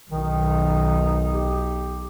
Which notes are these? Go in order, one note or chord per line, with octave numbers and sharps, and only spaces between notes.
B1 D#3 D#4
G4